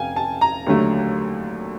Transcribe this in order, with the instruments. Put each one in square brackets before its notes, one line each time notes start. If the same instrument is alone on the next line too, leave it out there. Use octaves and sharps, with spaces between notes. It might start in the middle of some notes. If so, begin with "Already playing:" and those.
Already playing: [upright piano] F1 F5 G5 G#5
A5
A#5
D#2 D3 F#3 A3